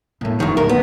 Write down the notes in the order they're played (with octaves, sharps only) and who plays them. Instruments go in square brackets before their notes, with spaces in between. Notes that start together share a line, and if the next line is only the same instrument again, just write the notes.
[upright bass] A2 A#3
[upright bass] F#1 [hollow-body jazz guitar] D2 D#3
[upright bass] D1 D2 [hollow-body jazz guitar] A#4
[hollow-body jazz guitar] B3